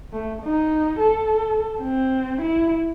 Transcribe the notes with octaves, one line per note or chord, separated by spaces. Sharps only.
A3
D#4
A4
C4
E4